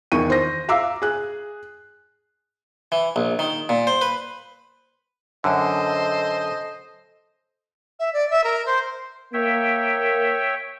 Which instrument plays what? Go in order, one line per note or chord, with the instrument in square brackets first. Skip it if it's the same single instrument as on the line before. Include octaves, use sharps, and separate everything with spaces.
[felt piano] E2 D#3 C#6 D#7
C5 A#6
E5 F5 A#5 D6 E6
G#4 F#6
[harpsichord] E3
A#1
D#3
A#2
C5
B4
[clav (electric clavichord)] F#2 D3 [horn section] A4 C5 D#5
[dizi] E5
D5
E5
A#4
C5
[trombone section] A#3 [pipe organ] C#5 E5 G5